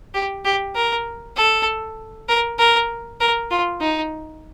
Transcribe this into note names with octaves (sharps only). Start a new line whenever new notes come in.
G4
G4
A#4
A4
A#4
A#4
A#4
F4
D#4